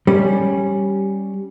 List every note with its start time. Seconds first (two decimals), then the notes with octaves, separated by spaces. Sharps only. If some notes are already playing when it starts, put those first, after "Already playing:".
0.07 G3 C#4